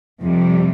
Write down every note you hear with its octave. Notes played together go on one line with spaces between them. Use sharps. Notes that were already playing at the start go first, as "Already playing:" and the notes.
F2 C3 G3